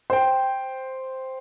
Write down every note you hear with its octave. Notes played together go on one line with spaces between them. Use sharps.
C5 G5